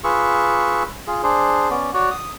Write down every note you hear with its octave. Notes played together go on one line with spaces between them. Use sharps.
F4 G#4 B4 C#6 E6
F4 G#4
D4 G#4 C5
B3 C#4 D5
F#4 C#5 D5
D#6